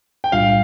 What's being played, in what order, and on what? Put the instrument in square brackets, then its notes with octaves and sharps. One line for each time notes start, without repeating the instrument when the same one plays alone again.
[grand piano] G5
[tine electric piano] B1 A2 G3 D4 F4 [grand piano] F5